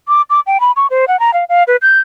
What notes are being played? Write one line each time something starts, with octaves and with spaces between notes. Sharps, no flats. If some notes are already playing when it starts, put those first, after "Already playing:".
D6
D6
G5
B5
C#6
C5
F#5
A#5
F5
F5
B4
G6